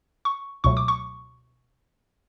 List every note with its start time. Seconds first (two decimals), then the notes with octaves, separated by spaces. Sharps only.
0.25 C#6
0.64 C#2 B2 F#3 A3 C#6
0.77 D6
0.88 C#6